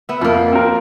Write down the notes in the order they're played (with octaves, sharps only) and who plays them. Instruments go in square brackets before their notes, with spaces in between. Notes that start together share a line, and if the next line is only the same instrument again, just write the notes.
[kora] B3 E5
[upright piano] F2 [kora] F3 A#3
[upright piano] C4 A#4